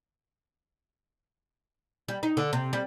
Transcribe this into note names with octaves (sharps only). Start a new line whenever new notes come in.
G3
D#4
D3
C3
G3